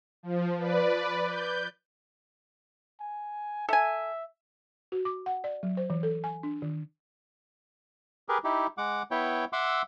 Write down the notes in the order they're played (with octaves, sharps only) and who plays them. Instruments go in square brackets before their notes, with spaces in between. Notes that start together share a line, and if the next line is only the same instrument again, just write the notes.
[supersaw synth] F3
B4 D5
G6
[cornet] G#5
[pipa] A4 G#5 [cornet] E5
[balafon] F#4
D6
F#5
D5
F#3
C5
E3
A4
G#5
D4
D#3
[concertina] G4 G#4 A#4 B4
D#4 E4 G4
G#3 F#5 D6
B3 E4 C#5 G5
E5 F#5 C6 D6 E6